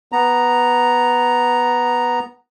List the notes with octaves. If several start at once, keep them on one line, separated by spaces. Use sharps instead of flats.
B3 A#5